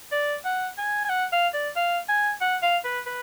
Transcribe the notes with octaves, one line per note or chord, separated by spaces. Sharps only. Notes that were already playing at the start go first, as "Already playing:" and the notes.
D5
F#5
G#5
G#5
F#5
F5
D5
F5
G#5
F#5
F5
B4
B4